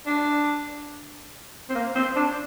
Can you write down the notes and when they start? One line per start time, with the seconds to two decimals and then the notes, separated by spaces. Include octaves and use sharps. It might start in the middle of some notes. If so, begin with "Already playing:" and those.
0.06 D4
1.70 C4
1.75 A#3
1.95 C4
2.16 D4